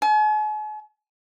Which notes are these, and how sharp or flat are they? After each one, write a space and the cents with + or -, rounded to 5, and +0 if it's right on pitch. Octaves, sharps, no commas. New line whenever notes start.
G#5 +45